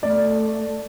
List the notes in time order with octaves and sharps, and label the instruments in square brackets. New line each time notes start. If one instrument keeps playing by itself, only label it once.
[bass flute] A3 [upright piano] D5